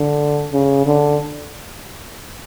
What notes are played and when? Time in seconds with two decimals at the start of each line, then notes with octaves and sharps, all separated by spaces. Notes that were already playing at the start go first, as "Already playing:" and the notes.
Already playing: D3
0.53 C#3
0.86 D3